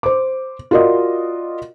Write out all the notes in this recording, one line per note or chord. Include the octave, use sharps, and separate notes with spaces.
C5 D6
F4 F#4 A#4 D5 D#5